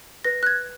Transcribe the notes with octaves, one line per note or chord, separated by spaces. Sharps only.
B4 A#6
F#6
G#6